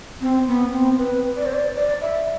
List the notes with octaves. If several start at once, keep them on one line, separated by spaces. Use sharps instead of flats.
C4
B3
C4
B4
D5
C5
D5
D5
E5